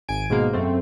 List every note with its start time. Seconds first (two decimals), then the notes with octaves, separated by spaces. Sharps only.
0.08 G#1 G#5 D7
0.30 G#2 B2 G#3 A#3
0.53 F#2 A3 C4